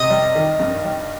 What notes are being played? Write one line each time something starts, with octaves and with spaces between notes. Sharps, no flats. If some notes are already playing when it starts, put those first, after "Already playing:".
Already playing: C3 D#5
G3
D#3
G2
G3